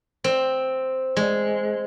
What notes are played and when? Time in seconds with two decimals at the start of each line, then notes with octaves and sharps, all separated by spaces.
0.24 C4
1.17 G#3